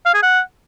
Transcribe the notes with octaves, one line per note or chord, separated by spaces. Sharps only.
F5
G#4
F#5